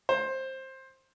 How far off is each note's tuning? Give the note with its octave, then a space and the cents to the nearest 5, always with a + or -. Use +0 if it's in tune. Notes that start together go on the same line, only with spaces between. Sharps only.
C5 +15